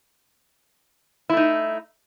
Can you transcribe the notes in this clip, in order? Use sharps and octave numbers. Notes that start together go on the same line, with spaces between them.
A3 D#4 E4